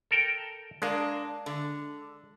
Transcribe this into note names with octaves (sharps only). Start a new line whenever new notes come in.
A4 A#4 G5
G#3 A#3 D4
D3